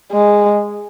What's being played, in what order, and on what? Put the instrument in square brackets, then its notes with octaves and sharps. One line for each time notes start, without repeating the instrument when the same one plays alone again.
[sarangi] G#3